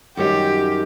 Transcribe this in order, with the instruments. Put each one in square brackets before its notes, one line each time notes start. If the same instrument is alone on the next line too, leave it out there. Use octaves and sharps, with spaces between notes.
[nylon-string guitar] F#2 D#3 G3 [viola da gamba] G4